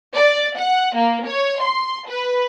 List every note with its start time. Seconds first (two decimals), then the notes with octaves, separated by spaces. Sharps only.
0.14 D5
0.58 F#5
0.96 A#3
1.26 C#5
1.61 C6
2.07 B4